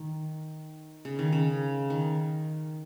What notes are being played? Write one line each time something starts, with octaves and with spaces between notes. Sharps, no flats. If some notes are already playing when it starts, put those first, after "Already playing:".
Already playing: D#3
C#3
D#3
C#3
D#3